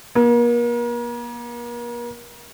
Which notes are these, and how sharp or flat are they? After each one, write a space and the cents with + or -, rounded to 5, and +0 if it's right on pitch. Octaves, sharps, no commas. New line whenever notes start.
A#3 +40